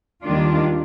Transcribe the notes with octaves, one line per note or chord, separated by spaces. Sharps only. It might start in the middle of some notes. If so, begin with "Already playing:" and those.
D#2 D#3 G3 D4 F4